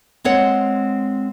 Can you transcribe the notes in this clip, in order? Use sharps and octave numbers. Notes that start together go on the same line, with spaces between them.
G#3 C4 C#5 F#5